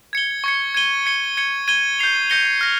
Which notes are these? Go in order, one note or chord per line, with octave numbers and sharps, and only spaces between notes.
G#6 C#7 G7
C#6 G#6 C#7
G#6 D#7 G7
G#6 C#7 G7
G#6 C#7 G7
G#6 D#7 G7
G6 C7 F7
G6 A#6 C#7 G7
F6 A#6